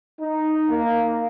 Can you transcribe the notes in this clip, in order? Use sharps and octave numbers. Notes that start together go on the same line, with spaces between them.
D#4
A#3